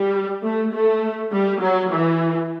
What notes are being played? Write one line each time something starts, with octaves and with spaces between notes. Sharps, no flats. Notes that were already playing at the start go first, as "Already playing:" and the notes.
Already playing: G3
A3
A3
G3
F#3
E3